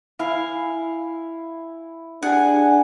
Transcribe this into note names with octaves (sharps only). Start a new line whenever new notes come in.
E4 F5 G#5
D4 G#4 F#5 G#5